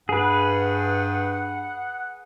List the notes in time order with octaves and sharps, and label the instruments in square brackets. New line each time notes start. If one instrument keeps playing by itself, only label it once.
[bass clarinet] G2 [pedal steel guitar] G#4 B4 [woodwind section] F#5